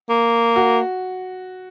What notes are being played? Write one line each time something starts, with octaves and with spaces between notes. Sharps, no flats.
A#3
F#4